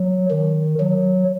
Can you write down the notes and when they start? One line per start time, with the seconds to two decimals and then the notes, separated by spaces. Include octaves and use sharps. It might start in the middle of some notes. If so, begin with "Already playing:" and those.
Already playing: F#3
0.31 D#3
0.80 F#3